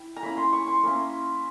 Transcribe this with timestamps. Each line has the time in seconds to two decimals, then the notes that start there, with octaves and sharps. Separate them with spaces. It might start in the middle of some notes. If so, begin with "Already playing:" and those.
Already playing: E4 G5
0.16 A#5
0.23 A#3 C#4 E4 B5
0.37 C6
0.53 C#6
0.67 C6
0.83 A#3 C#4 E4